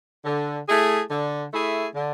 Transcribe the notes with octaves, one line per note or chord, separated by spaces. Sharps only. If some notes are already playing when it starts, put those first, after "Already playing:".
D3
A3 E4 G#4
D3
A3 E4 G#4
D3